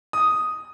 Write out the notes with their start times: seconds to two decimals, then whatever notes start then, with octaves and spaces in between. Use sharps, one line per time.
0.13 D#6